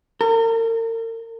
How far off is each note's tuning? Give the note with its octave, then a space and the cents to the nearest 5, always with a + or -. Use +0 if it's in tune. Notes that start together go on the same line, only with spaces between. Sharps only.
A#4 -40